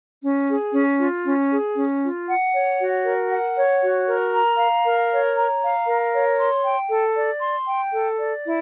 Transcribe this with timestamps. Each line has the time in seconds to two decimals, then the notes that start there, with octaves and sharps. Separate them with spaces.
0.22 C#4
0.48 G#4
0.73 C#4
0.99 F4
1.24 C#4
1.50 G#4
1.75 C#4
2.01 F4
2.28 F#5
2.53 C#5
2.79 F#4
3.04 A#4
3.30 F#5
3.56 C#5
3.82 F#4
4.07 A#4
4.33 A#5
4.58 F5
4.84 A#4
5.10 C#5
5.36 A#5
5.61 F5
5.87 A#4
6.12 C#5
6.38 C6
6.63 G5
6.90 A4
7.16 D5
7.41 C6
7.67 G5
7.92 A4
8.18 D5
8.44 E4